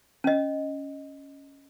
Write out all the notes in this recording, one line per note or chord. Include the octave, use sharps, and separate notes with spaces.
C#4 D#5